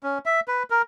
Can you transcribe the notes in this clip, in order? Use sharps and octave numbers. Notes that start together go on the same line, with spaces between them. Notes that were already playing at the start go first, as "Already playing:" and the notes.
C#4
E5
B4
A#4